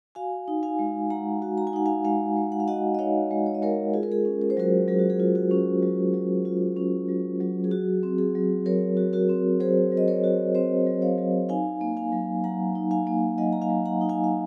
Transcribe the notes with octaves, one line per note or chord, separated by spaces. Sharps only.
F#4 F5 G#5
D#4
F5 G#5
G#3
G#3 F#5 A#5
F#4
A#5
G#5
D#4 F#5
F5 G#5
G#3 F5 G#5
G#3
F#5
F5
F#4 D#5 F#5
D#5
D#4 C#5 F5
G#3
C#5
D#5
G#3 A#4 C#5
F4 G#4
A#4
G#4
C#4
A#4
C5
F#3 F#4 A#4
F#3 G#4
F#4
G#4
F4
F#4
C#4
F#3
F#3
F4
C#4
F#3
F#3
G#4
F#4
C4
G#4
F#3
F#3 A#4 C#5
F#4
F#4 A#4
C4
F#3 G#4 C5
F#3
D#5
A#4 C#5
F#4
C4 C5 D#5
F#3
C#5 F5
F#3
D#4 F5 G#5
A#3
F5 G#5
F#3
F#3 F#5 A#5
D#4
F5 G#5
A#3
F#3 D#5 F#5
A#5
F5 G#5
F#3
F#5 A#5
D#4
F5 G#5
F5